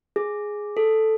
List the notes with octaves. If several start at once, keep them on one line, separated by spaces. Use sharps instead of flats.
G#4
A4